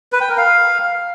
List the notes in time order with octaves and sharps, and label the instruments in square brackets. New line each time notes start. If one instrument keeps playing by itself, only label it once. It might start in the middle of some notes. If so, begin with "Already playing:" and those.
[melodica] B4
G5
A#4
F5